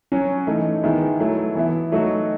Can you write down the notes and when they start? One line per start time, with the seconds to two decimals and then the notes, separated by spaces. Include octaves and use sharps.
0.12 F#3 C#4 F#4
0.47 E3 A3 D#4
0.83 D#3 G#3 B3 E4
1.20 F#3 A3 E4
1.55 E3 B3 E4
1.92 F#3 A3 D#4 F#4